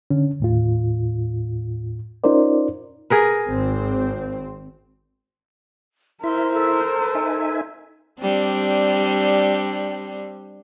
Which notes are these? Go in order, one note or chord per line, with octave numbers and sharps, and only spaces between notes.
D3 C#4
D#2 A2 F4
C#4 D#4 F4 A#4 C5 D5
G#4 A#4 B4
G#1 C4
E4 A#4 C5 E5 C6
A4
D#4 E5 G#5
G3 C4 D4